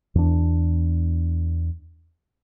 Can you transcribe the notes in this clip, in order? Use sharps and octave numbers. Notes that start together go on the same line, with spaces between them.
E2 D4